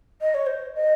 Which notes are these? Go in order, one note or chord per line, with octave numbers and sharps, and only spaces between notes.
D#5
C#5
C5
D#5